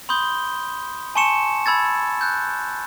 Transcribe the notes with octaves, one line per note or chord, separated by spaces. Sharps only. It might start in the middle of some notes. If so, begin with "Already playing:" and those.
B5 C6 D#6 G6 G7
G#5 A5 C6 C#6 C#7 E7
B5 E6 G#6 A6
F#6 G6